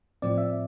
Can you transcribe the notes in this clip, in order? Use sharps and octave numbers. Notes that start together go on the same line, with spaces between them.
A2 F3 C4 D5
E5